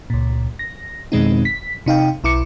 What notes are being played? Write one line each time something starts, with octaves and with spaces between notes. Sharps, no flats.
C#2 A#2
A#6
F2 B2 D#3 G#3 C4 D#4
B6
C3 D#4 F5 G5
B1 E4 D6 C#7